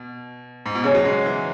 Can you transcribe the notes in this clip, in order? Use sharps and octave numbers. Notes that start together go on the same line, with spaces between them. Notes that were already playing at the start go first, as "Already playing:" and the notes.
Already playing: B2
G#2
B2
C#3 C#4 G#4 C#5 G#5
F#3
G#3
E3